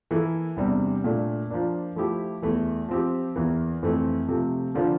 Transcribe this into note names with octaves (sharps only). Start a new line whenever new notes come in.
E3 A#3 E4 A4
E2 C3 G3 D4
A#2 A3 D4
F3 A#3 D4
F3 A3 E4 G4
E2 E3 A3
F3 C4 G4
E2 E3 A#3
F2 E3 A3 C4
C3 F3 A3
D3 F3 A#3 D4 F4